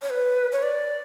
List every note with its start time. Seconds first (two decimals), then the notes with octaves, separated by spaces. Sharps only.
0.02 C#5
0.10 B4
0.52 C#5
0.63 D5